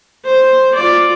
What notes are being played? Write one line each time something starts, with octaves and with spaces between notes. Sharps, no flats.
C5
F4 D5